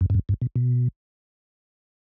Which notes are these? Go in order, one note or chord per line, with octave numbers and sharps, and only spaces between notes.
F#2
G2
F#2
G2
B2
B2